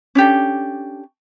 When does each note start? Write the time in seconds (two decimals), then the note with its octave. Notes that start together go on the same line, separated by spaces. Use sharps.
0.15 C#4 D4 G4 A4